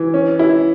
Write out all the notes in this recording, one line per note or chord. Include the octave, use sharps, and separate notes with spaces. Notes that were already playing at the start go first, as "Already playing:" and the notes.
Already playing: E3
C#4
E4